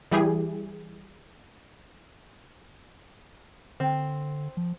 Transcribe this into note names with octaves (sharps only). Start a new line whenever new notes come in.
E3 G3 E4 G4 G#4
D3 C4
F3